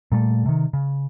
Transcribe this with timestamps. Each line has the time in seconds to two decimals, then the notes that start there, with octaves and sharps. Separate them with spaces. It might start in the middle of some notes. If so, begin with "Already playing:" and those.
0.12 A#2 G3 A3
0.46 C3 D#3
0.73 C#3